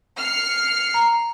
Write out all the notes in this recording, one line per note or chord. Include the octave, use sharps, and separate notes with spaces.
F6 C7 C#7
A#5